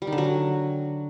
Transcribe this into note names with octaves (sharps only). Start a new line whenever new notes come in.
G3
D#3
D3
F#3